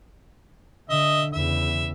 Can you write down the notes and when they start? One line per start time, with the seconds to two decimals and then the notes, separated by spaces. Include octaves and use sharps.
0.89 D3 D#5 E5
1.33 E2 C#3 E5